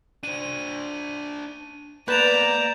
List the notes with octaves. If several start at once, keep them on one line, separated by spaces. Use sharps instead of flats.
D4 C5 D#7
A#3 B3 B4 D5 A#5 G6 E7 F7